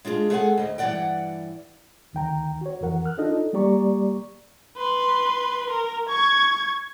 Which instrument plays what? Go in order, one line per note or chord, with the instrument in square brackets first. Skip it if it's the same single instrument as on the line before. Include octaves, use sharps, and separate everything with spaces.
[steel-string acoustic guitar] G#3 D4 F4 F#4 G#4
G#3 G#4 A4 D#5 F#5 G#5
D2 D#5
G2 E3 F#3 D5 F#5 G5
[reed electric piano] D2 D#3 G5 A#5
F#4 C#5
F2 E3 A#4 F#5
F6 F#6
D4 D#4 F4 A4 D#5
G3 A#3 G4 D5 A#5 C#6
[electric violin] B4 C6
A#4
C#6 G#6